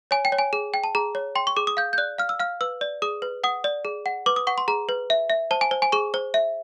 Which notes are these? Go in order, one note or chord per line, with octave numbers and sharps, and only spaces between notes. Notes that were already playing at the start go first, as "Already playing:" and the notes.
C#5 G#5
G5
C#5
G#5
G#4
G5
A5
G#4 A#5
C#5
G5 C6
C#6
G#4 D6
D#6
F5 G6
G6
D5 F#6
F5 F6
E6
F5 F6
B4 E6
D5
G#4 D#6
B4
F#5 D#6
D5
G#4
F#5
B4 D6
D#6
F#5 C#6
C6
G#4 A#5
B4
E5
E5
C5 A5
G#5
C5
G#5
G#4 C#6
C5
E5